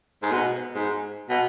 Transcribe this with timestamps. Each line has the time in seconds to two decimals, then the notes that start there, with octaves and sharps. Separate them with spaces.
0.22 G#2
0.31 B2
0.75 G#2
1.29 B2